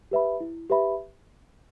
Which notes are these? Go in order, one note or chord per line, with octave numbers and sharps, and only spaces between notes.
G4 B4 E5 B5
E4
G4 B4 E5 B5